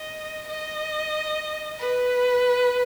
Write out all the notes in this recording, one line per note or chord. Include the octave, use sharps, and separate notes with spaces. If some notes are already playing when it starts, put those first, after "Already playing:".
Already playing: D#5
D#5
B4